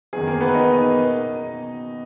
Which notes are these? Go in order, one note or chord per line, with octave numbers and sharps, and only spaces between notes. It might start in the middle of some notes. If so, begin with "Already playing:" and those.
F#1 E2 D#3 G#4
A#3 A#4
B3 B4
D#4 D#5
B2